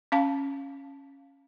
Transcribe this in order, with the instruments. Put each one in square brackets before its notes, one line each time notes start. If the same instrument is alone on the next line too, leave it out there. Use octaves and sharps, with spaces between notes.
[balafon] C#4 F5 A5